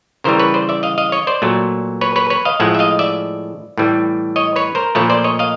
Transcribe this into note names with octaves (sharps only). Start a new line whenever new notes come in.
C#3 E3 G3 A#4 C5
B4 C#5
C5 D5
D5 E5
D#5 F5
D#5 F5
C#5 D#5
C5 D5
A#2 F#3 A3
B4 C#5
B4 C#5
B4 C#5
D#5 F5
A2 F3 G#3 E5 F#5
E5
D#5 F5
D5 E5
A2 E3 G3
C#5 D#5
B4 C#5
A#4 C5
A#2 F3 A3 B4 C#5
C5 D5
C#5 D#5
D#5 F5